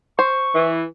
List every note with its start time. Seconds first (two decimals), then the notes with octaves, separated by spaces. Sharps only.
0.19 C5 C#6
0.54 E3